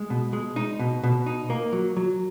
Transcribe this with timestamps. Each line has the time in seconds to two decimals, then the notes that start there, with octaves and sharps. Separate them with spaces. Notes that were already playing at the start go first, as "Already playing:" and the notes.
Already playing: G#3
0.10 B2
0.33 G#3
0.56 D#4
0.79 B2
1.03 B2
1.26 D#4
1.50 A#3
1.73 F#3
1.97 F#3